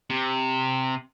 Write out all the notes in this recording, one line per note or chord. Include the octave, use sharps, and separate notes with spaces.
C3